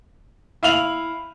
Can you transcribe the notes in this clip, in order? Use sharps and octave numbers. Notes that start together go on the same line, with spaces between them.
E4 F5 F7 F#7